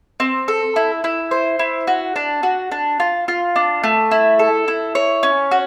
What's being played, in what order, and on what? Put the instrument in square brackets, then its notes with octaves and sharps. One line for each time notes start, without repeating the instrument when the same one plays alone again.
[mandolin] C4
A4
E4
E4
C5
E4
F#4
D4
F#4
D4
F4
F4
D4
A3
E4
A4
E4
C#5
C#4
F#4